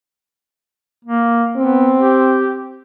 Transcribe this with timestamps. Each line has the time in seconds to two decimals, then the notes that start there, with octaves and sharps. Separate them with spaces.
1.05 A#3
1.57 B3 C4
1.99 G4